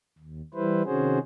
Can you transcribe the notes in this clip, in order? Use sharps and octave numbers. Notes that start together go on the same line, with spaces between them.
D#2
E3 G3 E4 B4 C5
C3 D#3 C#4 F#4 G#4 C5